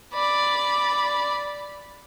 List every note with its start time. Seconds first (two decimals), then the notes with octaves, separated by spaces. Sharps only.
0.14 D5 B5